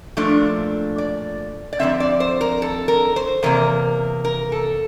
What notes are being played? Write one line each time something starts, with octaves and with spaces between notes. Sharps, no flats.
A#2 F3 A3 D4
D5
D5
F2 D3 G3 C4 E5
D5
C5
A#4
A4
A#4
C5
E2 C3 A#3 A#4
A#4
A4